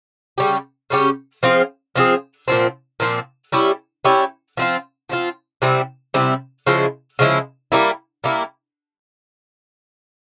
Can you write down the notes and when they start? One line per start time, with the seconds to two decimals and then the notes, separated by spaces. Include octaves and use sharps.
0.38 C#3 G3 C#4 G4
0.90 C#3 G3 C#4 G4
1.43 F3 C4 F4 G#4
1.95 F3 C4 F4 G#4
2.48 A#2 F3 C4
3.00 A#2 F3 C4
3.52 G3 C#4 E4 G4
4.05 G3 C#4 E4 G4
4.57 F3 C4 F4
5.09 F3 C4 F4
5.62 C3 G3 C4 E4
6.14 C3 G3 C4 E4
6.67 C#3 F3 G#3 E4
7.19 C#3 F3 G#3 E4
7.72 G3 A#3 E4
8.24 G3 A#3 E4